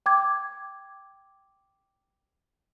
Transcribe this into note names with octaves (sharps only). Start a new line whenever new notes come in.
G5 D6 G#6